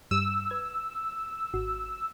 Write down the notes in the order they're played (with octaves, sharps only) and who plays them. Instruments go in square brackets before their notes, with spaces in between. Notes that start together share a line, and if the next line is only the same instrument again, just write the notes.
[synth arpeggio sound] G2 G3 D#7 [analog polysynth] E6
[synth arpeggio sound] B4 G#6
G#1 F#4